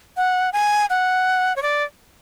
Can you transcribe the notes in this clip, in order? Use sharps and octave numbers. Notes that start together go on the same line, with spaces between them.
F#5
G#5
F#5
C#5
D5